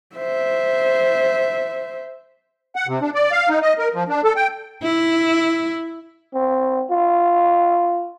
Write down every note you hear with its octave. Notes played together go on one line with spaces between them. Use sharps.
C5 E5
F#5
C3
D4
D5
F5
D#4
D#5
A#4
F3
D4
A4
G5
E4
C4
F4